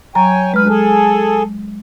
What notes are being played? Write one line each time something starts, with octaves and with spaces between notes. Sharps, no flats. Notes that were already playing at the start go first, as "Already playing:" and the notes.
F#3 C#5 G5 G#5 A#5
D2 G#3 B4 F6
G#4 A4